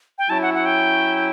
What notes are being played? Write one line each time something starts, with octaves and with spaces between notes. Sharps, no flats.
G5
F#3 C#4 E4 A5
F#5
F#5
G5